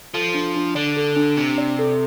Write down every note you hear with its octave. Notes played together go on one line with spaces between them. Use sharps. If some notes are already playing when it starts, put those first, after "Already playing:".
F3 A4
D4
D4
D3 D5
A4
D4
C3 D4
D5
A4